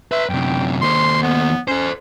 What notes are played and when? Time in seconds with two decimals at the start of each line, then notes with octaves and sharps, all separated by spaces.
0.12 B4 E5 C6
0.30 F#2 C3 G5
0.81 D#2 C5 C6
1.23 B3
1.68 C#4 A4 C5